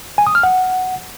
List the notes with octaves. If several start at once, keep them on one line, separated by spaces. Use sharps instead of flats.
G#5
D#6
F6
F#5